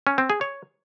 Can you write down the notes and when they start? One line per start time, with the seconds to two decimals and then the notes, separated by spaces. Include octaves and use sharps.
0.07 C#4
0.18 C4
0.30 G#4
0.41 C#5